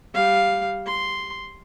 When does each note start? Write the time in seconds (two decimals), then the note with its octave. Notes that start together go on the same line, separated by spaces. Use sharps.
0.14 G3 F5
0.86 C6